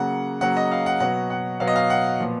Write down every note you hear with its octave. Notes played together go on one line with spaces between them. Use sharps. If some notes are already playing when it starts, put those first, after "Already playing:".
Already playing: C#3 F#3 A#3 F#5
C#3 F#3 A#3 F#5
D#5
F5
F#5
B2 F#3 B3 F#5
F#5
B2 F#3 B3 F5
D#5
F5
F#5
A#2 F3 B3